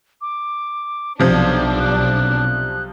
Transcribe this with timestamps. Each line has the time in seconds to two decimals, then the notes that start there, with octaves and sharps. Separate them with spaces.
0.21 D6
1.19 B1 C3 F3 D4 G#6
1.80 F#6